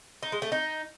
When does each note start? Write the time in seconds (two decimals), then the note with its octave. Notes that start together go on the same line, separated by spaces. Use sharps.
0.23 D#4
0.32 G#3
0.42 A3
0.52 D#4